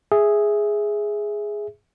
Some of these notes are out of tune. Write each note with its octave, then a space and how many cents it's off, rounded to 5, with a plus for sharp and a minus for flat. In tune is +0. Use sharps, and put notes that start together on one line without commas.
G#4 +0 E5 +0